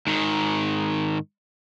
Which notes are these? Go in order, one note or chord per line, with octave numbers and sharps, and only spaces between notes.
G#2 D#3